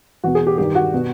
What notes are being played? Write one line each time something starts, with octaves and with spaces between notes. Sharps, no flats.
E2 B2 F#4
G#4
G4
G2 D#3 G4
F#4
B2